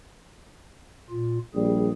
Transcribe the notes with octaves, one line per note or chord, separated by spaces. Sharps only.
A#2 F4
A#1 G3 G#4